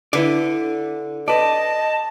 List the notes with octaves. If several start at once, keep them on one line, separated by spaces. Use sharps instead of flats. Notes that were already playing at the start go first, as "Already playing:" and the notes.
D3 E4 B4 D5
B4 D5 D#5 A5